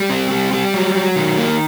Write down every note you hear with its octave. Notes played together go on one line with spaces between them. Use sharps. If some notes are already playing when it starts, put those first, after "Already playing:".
Already playing: G3
C4
G3
G3
F#3
F#3
D#3
A#3